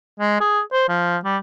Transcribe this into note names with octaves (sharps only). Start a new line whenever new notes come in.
G#3
G#4
C5
F3
G3